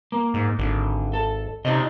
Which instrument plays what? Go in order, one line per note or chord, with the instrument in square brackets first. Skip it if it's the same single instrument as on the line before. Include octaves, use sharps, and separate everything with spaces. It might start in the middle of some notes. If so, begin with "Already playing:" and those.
[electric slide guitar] A#3
[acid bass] G#2
[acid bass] G#1 [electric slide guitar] D3
[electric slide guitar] A4
[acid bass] C3 [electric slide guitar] D#4 D5 D#5